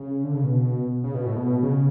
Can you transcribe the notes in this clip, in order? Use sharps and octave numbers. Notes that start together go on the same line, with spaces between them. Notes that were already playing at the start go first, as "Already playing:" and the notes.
Already playing: C#3
D3
C#3
B2
C#3
B2
A2
B2
C#3